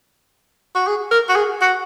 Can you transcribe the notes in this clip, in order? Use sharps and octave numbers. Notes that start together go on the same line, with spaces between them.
F#4
G#4
A#4
F#4
G#4
F#4